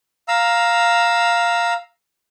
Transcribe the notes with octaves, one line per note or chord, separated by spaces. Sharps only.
F5 A#5 E6